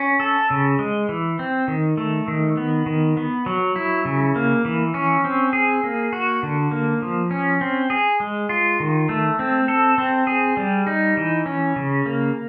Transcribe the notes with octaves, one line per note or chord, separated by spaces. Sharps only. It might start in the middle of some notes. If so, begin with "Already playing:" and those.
Already playing: C#4
A4
C#3
G#3
E3
C4
D#3
A3
D#3
B3
D#3
B3
F#3
E4
C#3
A#3
E3
C#4
C4
G#4
A#3
F#4
D3
A#3
F3
C#4
C4
G#4
G#3
F4
D#3
A3
C4
A4
C4
G#4
G3
D#4
E3
C#4
C#3
A#3